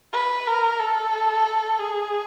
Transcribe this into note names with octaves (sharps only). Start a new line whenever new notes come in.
B4
A#4
A4
G#4